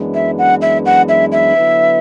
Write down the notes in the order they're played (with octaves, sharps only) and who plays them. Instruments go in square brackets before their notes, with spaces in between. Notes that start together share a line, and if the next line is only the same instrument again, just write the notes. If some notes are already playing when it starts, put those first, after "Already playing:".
Already playing: [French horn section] F#2 E3 G#3 B3 D4
[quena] E5
F#5
E5
F#5
E5
E5
[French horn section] D3 F#3 B3 E4 B4